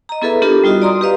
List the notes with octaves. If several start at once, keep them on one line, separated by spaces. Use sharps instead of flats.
D#5 A#5
B3 E4 G#4 A4 B4 E5
B3 D4 F4 G4 A4 A#4
G3 D#4 F4 F#4 D#5
D5 D#5 A#5 C6 D#6
G4 B4 D#5 F5